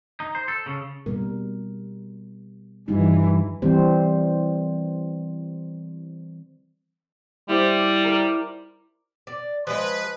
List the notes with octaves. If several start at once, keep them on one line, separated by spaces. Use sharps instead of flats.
D#4
C5
A4
C#3
B2 G3 A#4
G2 E3 G3 D#4 F4
E3 G3 C4 C5
G3 E4 G4 C5
A#4 D5
D5
F3 G#3 B4 D#5